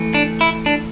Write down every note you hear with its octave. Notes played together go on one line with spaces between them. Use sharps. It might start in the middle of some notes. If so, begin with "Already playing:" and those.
Already playing: E3 A3
D4
E4
D4